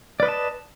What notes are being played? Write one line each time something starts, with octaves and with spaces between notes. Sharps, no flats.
B4 D5 D#5 A5